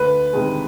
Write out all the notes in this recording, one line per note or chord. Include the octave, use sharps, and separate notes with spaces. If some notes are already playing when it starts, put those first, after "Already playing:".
Already playing: D2 B4
C3 D#3 G#3